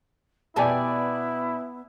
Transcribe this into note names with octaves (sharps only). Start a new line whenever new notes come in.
B2 B3 E4 G4 D5 E5 G#5 A5